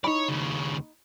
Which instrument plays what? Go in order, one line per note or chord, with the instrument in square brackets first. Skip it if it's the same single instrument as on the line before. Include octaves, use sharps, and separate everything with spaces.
[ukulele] D#4 B5 [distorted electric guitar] C#5 D5
[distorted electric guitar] D#2 C#3